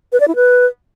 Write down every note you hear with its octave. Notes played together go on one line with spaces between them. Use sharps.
B4
D5
E4
B4